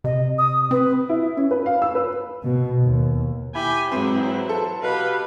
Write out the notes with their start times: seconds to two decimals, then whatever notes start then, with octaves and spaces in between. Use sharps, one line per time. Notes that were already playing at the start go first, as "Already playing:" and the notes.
0.04 C3 D#5
0.38 D#6
0.71 C4 B4
1.09 E4
1.37 C#4
1.51 B4
1.66 F5
1.82 E6
1.95 B4
2.43 B2
2.82 D#2
3.55 E4 G4 G5 G#5 B5
3.92 G#2 E3 F#3 C4 E4 C5
4.49 A4
4.83 B2 G4 B4 F5